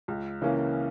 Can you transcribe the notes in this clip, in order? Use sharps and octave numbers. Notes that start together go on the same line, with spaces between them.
C#2
C#3 E3 A#3 C#4